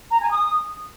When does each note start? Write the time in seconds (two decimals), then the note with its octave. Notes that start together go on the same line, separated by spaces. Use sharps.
0.09 A#5
0.20 G#5
0.31 D#6